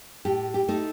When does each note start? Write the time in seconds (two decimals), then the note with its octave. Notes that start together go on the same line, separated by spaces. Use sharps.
0.25 A2 G4
0.54 G4
0.68 A3 D#4